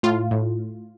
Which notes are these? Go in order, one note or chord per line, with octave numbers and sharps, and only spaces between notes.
A2 F4
A2